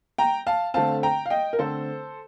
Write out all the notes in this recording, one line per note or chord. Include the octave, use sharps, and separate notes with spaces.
G5 A#5
F5 A5
D3 A3 C4 F5 A5
G5 A#5
F5
D#5 G5
A#4
D3 A3 C4 A4 C5